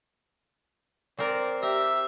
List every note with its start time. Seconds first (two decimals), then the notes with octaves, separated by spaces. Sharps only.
1.19 C4 A#4 D5
1.63 G4 E5 A#5